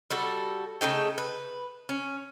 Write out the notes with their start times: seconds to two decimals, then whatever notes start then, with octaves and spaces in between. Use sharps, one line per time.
0.10 G3 F#4 A4
0.81 C#3 A3 D#4 G5
1.18 B4
1.89 C#4